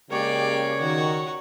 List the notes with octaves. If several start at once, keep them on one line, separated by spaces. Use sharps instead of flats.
C#3 G#3 A#3 C#4 G4 C#5 D5
D#3 F#4